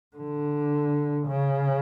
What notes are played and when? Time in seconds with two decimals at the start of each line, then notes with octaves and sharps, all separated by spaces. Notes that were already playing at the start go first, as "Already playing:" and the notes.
0.16 D3
1.27 C#3